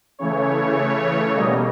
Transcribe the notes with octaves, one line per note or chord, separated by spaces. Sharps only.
C#3 E3 A3 C#5
B2 G3 A#3 D#5